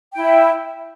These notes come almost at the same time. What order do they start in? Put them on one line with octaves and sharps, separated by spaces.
G5 E4 E5